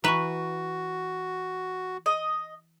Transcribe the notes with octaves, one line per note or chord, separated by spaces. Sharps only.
E3 F#4 B4 A#5 C#6
D#5